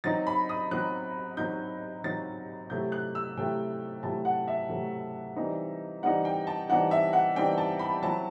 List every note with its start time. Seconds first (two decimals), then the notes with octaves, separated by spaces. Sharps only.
0.04 F#3 C4 D#4 A6
0.27 B5
0.49 D#6
0.71 F#3 C4 D#4 F#6
1.37 F#3 C4 D#4 G6
2.04 F#3 C4 D#4 A6
2.70 C3 F#3 A3 E4 G6
2.92 F#6
3.15 E6
3.37 C3 F#3 A3 E4 G5
4.03 C3 F#3 A3 E4 A5
4.25 F#5
4.48 E5
4.69 C3 F#3 A3 E4
5.36 E3 G3 C4 D#4
6.03 E3 G3 C4 D#4 F#5
6.25 G5
6.47 A5
6.69 E3 G3 C4 D#4 F#5
6.91 E5
7.13 F#5
7.35 E3 G3 C4 D#4 G5
7.58 A5
7.79 B5
8.02 F#3 C4 E4 A5